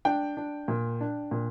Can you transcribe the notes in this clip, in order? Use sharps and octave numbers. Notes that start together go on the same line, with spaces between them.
D4 G5
D4
A#2
D4
A#2